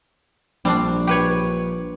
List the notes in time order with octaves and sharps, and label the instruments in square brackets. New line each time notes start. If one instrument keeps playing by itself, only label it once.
[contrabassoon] A#1 [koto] G3 C4 D4
[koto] G4 B4 C#5